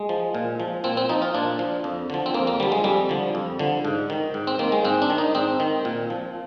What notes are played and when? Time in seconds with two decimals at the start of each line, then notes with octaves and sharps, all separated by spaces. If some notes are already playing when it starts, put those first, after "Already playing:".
Already playing: G#3
0.09 F3
0.35 A#2
0.60 F3
0.84 A#2 C4
0.97 C4
1.09 F3 D#4
1.22 F4
1.34 A#2 D4
1.59 F3
1.84 F2
2.10 D3 F3
2.26 C4
2.34 F2 A#3
2.47 A#3
2.60 D3 F3 G3
2.72 G#3
2.84 F2 G3
3.09 D3 F3
3.35 F2
3.59 D3 F3
3.85 G#2
4.10 D#3
4.34 G#2
4.47 C4
4.59 D#3 A#3
4.72 G#3
4.85 G#2 C4
5.02 D4
5.10 D#3
5.18 D#4
5.35 G#2 C4
5.60 D#3
5.85 A#2
6.10 F3